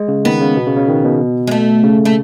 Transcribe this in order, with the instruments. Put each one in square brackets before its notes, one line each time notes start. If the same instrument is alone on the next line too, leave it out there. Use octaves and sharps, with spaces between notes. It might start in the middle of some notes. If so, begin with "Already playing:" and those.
Already playing: [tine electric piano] G#3
C#3
[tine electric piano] D#3 [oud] B3
[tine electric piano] C#3
B2
C#3
C#3
D#3
B2
[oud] G#3
A3
[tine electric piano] C#3
[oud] A3